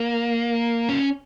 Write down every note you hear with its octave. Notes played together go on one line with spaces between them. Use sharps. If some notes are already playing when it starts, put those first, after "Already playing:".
Already playing: A#3
C#4